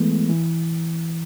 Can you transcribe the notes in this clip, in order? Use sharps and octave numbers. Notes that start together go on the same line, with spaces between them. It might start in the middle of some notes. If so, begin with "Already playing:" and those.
Already playing: E3 G#3 A3 B3
E3